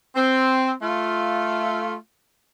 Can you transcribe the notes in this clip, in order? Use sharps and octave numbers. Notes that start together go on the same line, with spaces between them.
C4
A3 F4